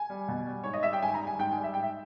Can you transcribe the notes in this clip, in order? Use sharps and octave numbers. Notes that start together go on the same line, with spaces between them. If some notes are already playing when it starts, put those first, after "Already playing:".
Already playing: G#5
G3
B2
G3
G#2 C#5
D#5
G3 E5
G5
G#2 G#5
A#5
G3
G#5
G#2 G5
G#5
G3
E5
G#2 G5
E5